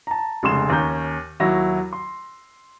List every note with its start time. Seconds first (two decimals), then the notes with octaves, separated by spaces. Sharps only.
0.07 A5 A#5
0.43 F1 C#3 G#3 C6 E7
0.70 D#2 C#4 A#5 G6
1.40 D#2 F#3 E4 E6 A#6
1.93 C6